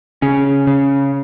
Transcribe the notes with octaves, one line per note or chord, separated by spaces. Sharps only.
C#3 C#4
C#3